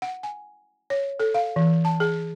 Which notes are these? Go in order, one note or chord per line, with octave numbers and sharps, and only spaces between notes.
F#5
G#5
C#5
A4
F5
E3
A5
G#4